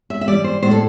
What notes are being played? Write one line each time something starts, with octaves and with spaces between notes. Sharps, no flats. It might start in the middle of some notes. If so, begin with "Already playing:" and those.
E5
E5
E3 G3 D5
C5
A2 C5
A4